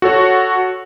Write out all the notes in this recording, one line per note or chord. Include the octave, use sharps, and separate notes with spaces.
F#4 A4 C#5